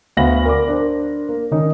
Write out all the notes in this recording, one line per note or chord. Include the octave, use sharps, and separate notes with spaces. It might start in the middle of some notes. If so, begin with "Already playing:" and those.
D2 B3 F5 B5 A#6 F#7
A#4 D5 D6
D4 A#4 C5
A#3
D#3 C#4 D#4